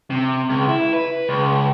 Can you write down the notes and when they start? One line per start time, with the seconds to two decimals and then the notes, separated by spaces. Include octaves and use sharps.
0.11 C3
0.49 C#2
0.68 E4
0.93 B4
1.29 C#2